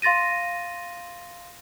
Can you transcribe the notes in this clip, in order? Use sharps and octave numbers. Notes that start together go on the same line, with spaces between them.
F5 C6 A6 A#6 D#7